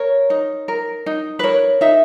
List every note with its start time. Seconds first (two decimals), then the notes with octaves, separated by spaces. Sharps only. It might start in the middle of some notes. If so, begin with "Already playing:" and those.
Already playing: A#4 C#5
0.30 D#4
0.68 A#4
1.06 D#4
1.39 B4
1.43 A#4 C#5
1.81 D#4 E5